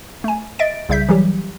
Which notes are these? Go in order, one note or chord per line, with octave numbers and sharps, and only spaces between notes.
A3 G#5
D#5 E5 A6 D7
C2 C#3 G3 E5 G6 B6
E3 F#3 G3 G4